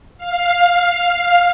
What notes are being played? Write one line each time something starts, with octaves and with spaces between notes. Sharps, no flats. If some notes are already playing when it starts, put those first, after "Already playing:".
F5